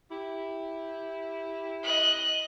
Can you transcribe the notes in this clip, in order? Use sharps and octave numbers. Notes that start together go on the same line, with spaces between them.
E4 G4
D#5 F#6